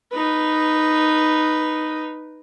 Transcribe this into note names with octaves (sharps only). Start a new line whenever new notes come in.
D#4 B4